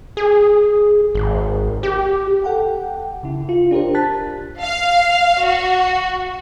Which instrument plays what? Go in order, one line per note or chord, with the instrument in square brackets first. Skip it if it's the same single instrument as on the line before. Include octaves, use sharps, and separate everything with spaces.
[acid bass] G#4
G#1
G4
[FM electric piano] A4 F#5 G5
C#3 E4
F4
D4 G4 A#4 C5
A5 F#6 A6 B6
[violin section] F5
F#4